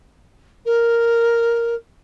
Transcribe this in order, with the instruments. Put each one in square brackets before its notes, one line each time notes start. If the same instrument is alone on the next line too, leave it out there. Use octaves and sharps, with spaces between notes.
[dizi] A#4